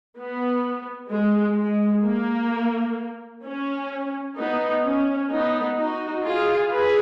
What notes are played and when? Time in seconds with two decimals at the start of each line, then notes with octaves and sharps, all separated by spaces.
0.17 B3
1.10 G#3
1.57 G#3
2.04 A#3
3.44 C#4
4.37 B3 D#4
4.84 C#4
5.31 B3 D#4
5.78 D#4 F#4
6.24 F4 G#4
6.71 G#4 B4